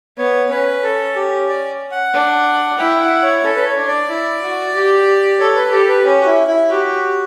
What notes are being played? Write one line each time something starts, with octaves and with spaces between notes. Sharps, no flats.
B3 C#5
C#4 B4
A4
G4
D5
F#5
D4
E4 G5
F#5
C#5
C#4 A4
B4
C#5
D4
D5
E4
F#4
G4
A4 C#5
B4
G4 A4
B4
C#4 G4
F#4
E4
E4
F#4 G4